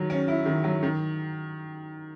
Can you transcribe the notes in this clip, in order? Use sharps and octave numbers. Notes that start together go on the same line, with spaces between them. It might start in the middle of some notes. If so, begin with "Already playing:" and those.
Already playing: D#3 F#3
C#4
E4
D#3
F#3
D#3